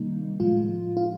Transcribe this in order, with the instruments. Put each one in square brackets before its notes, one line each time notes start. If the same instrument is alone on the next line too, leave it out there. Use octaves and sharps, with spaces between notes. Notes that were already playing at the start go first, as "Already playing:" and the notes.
Already playing: [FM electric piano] C3 D#3 G3 A#3 D#4
A2 F3 G#3 F4
F4